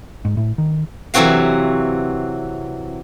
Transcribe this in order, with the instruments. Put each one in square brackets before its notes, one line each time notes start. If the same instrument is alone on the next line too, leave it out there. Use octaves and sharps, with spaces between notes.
[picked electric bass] G#2
A2
D#3
[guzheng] C3 E3 F#3 C4 F#4 F5